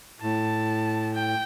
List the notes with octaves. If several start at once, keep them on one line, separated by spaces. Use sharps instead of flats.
A2 A5
G5